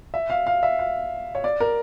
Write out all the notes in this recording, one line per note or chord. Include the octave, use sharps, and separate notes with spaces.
E5
F5
F5
E5
F5
C#5
D5
A#4